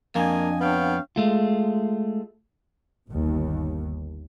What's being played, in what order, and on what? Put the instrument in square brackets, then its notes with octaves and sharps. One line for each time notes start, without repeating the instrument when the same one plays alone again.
[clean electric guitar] F2 [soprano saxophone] A#3 [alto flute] D4 [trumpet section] D#5 G#5
[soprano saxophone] B3 [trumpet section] C#5 F5 G5
[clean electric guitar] G#3 A3 F4
[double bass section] G1 D#2